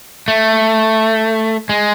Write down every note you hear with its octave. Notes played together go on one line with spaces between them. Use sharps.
A3
G#3